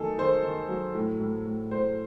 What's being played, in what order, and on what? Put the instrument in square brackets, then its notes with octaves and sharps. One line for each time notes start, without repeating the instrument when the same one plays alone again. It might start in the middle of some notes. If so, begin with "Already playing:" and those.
Already playing: [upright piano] D#3 F#3 A3 G#4 A4
D#3 C5
D#3
F#3
A2
A2
A2
A2 C5